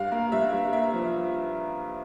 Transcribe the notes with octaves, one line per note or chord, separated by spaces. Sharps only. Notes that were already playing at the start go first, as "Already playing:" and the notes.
Already playing: G2 F5
A#3
G2 E5
G2
A#3 E5
F3